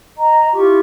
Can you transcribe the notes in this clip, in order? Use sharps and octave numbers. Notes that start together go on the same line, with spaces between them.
D#5 A#5
E4 F4 G4 C#6